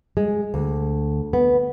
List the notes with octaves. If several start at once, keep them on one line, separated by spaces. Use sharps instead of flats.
G#3
D2
B3